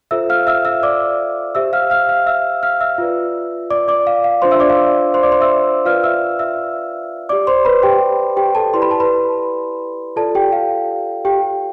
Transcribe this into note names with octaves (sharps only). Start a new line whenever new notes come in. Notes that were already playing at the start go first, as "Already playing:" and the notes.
F4 A4 C5 E5 E6
F5 F6
E5 E6
E5 E6
D5 D6
G4 C5 E5 E6
F5 F6
F5 F6
F5 F6
E5 E6
F5 F6
E5 E6
F4 B4 D5
D5 D6
D5 D6
F5
F5
D4 F4 C5 C6
E5 E6
D5 D6
F5
C5 C6
D5 D6
C5 C6
E5 E6
F4 B4 D5 F5 F6
E5 E6
E5 E6
G4 D5 D6
C5 C6
B4 B5
G4 G5
G4 G5
A4 A5
E4 G4 B4 D5 C6
B5
A5
B4 B5
F4 A4 D5 A5
G4 G5
F5
G4 G5